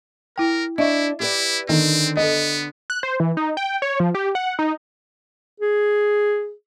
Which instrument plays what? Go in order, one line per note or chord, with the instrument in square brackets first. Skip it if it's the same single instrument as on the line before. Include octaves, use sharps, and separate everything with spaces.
[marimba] E4 G5 [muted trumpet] A#4
[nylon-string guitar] D4 [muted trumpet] E4 [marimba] D#5 E5 C#6
[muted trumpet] E4 [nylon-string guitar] G4 B4 D5
[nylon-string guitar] D3 [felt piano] D#3 [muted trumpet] C4
[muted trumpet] B3 [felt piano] A4 D#5
[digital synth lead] F#6
C5
E3
D#4
G5
C#5
F3
G4
F#5
D#4
[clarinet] G#4